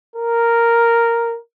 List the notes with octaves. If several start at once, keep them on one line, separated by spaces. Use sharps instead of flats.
A#4